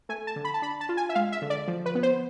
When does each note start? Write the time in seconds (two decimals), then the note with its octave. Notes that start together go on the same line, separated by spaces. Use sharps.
0.09 A3 G#5
0.27 A5
0.36 D3
0.45 B5
0.54 A5
0.62 D4 B5
0.81 A5
0.89 F4
0.97 G#5
1.09 E5
1.15 G#3 F5
1.32 E5
1.42 D3
1.50 D5
1.68 F3
1.86 B4
1.95 B3
2.03 C5